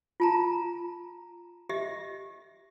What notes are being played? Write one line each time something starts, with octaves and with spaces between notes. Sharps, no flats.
F4 A5 A#5
G4 D#5 E5